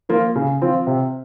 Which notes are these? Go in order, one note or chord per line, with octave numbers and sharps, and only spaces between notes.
F3 A#3 F4 A#4
C#3
F3 C4 F4
C3